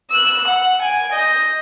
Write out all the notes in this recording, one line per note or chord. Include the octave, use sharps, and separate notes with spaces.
E6 F#6
F#5
G#5 D7
D#5 G6